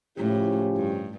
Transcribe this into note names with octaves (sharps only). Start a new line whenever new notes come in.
A2 C#3 F3 C#4 E4 G4
G2